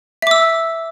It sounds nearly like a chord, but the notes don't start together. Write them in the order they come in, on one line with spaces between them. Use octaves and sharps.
E5 D6 E6